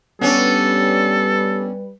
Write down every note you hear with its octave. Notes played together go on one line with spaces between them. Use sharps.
G3 B3 C#4 D4 A4 B4